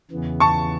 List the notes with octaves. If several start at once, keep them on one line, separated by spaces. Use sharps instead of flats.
E2 C#3 E3 B3
A5 C#6